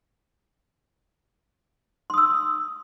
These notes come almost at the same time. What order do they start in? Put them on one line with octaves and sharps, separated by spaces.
C6 D#6 E6